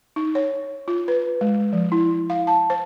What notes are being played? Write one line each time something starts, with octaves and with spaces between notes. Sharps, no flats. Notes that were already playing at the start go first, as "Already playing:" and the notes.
D#4
C#5
F4
B4
G#3
F3
E4
F5
A5
C5